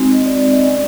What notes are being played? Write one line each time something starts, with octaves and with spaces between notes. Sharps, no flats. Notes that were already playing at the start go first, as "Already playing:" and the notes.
Already playing: G#3 C4 D#4 F#4
D#5
D5
D5
D#5
G#3 C#4 F#4 D5